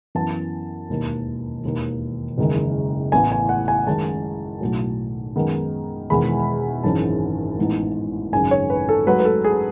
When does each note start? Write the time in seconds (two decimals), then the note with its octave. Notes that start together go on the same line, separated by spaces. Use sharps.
0.15 F#2 E3 B3 A5
0.89 E1 D#2 D#3
1.64 E1 D#2 D#3
2.38 F#1 E2 D#3 G#3
3.12 A1 A2 E3 B3 G#5
3.32 G#5
3.49 F#5
3.68 G#5
3.86 F#2 D#3 G#3 C#4 A5
4.61 B1 A2 F#3
5.36 F#2 D#3 G#3 B3
6.10 E1 E2 D#3 G#3 B5
6.84 G#1 F#2 E3 G#3 C#4 A5
7.59 A1 G#2 E3 B3 D#4
8.32 G#1 F#2 C#3 G#5
8.51 C#5
8.70 B4
8.89 A4
9.06 G#2 F#3 A3 B4
9.20 B4
9.25 A4
9.44 G#4